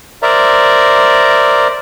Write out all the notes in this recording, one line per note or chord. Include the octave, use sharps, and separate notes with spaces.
A#4 C5 D5 E5 A#5